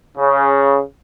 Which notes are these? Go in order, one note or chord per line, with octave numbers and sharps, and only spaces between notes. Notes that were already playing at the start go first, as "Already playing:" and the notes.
C#3